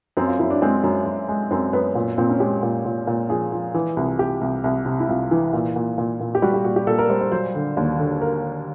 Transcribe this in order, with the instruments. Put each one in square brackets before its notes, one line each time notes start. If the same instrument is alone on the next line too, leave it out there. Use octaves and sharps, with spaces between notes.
[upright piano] F#2 C4
F4
F#2 E4
D4
G#3 C4
F#2
F#2
G#3
F#2 C4
F#2 B3
A#2 B3
A#2 C4
C#4
G#3 G4
A#2
A#2
A#2
F3 G#4
F3
E3
C2
C2 G4
C2
C2
C3
E4
C2 F4
E3
A#2
A#2
A#2
A#2
G4
G3 F#4
G4
A#2 F#4
G4
A#2 A4
A#4
G3 C5
C5
F#3 C5
D3
D#2
D3
A#4